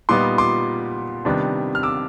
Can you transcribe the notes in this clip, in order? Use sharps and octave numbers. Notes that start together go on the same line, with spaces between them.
A#2 G3 B3 D#4 C6 D6
C6 D6
C3 D#3 G3 B3 D4
F6
D6 E6